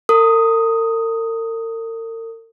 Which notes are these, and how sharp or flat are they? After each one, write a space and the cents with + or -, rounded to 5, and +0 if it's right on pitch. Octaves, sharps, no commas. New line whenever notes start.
A#4 -45 D#6 +0